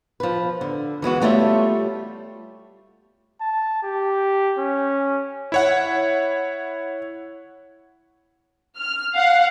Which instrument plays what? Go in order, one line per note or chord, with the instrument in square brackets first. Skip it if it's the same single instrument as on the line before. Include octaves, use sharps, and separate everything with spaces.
[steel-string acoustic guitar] F3 B4
D3
E3 G#3 B3 F#4
G3 A3 F4 C#5 D#5 E5
[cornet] A5
G4
C#4
[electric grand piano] E4 C#5 F#5
[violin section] F6
F5 F#5